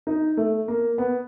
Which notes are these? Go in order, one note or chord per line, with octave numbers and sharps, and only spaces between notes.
D#4
A3
A#3
B3